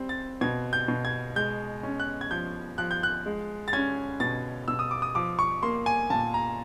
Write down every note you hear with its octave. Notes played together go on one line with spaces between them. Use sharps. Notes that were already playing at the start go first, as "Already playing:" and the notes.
Already playing: G3 C4
A6
B2 G#6
G6
B2
G#6
G#3 G6
C#4
F#6
G#6
F3 G6
F3 F#6
G6
F#6
G#3
A6
C#4 G#6
B2 A6
B2 E6
D#6
D6
D#6
F3 D6
C#6
A#3 C6
G#5
A#2 A5
A#5